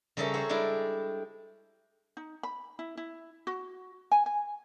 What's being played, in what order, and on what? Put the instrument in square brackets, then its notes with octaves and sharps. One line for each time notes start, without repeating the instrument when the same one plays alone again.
[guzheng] C#3 G3 C#4 A4 A#4 E5
F#4 C5 C#5 E5
G3 G#3 D4 E4 A4
[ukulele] D#4
B5
E4
E4
F#4
G#5
G#5